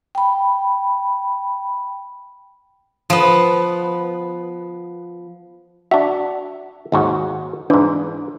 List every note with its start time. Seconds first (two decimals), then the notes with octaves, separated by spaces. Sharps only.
0.15 G5 B5
3.10 F3 B3
5.91 D4 F#4 E5
6.92 D#2 G#2 F#4
7.70 G#2 E3 D4